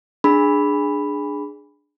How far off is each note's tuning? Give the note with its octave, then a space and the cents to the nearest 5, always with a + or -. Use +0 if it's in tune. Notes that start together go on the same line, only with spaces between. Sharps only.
D4 +10 G#4 +0 B5 +0